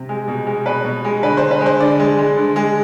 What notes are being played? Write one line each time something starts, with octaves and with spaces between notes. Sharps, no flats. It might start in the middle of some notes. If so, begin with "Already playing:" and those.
Already playing: C3
G#3
B2
G#3
B2 B4
B2
G#3
D3 B4
D3 C5
B4
G#3
C5
D3 D5
G#3
G#3
D3
G#3